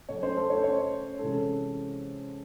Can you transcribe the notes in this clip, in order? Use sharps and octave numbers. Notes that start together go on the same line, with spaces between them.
C#3 F#3 A3 C#4 C#5
C5
A4
C#5
C5
C#5
C3 E3 G#3 C#4 A4